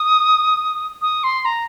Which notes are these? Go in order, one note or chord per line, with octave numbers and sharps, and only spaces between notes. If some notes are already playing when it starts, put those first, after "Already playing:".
Already playing: D#6
D#6
C6
A#5